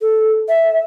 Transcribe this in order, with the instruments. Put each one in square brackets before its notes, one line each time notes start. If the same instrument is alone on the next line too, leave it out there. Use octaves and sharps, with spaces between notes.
[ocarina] A4
E5